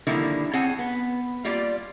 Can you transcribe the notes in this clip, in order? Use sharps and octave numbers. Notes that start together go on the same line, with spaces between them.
D3 D#3 F3 G3 A#3 E4
C4 G#4 C#5 F#5 G#5 A5
B3
G3 A#3 F4 G4 D5